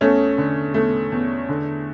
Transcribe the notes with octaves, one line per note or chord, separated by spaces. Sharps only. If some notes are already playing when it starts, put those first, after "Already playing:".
E2 A3 C#4
D3
E2 A3
E2
D3